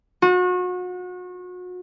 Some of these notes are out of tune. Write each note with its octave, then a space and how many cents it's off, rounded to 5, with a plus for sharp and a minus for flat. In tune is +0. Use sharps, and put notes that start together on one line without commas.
F#4 -35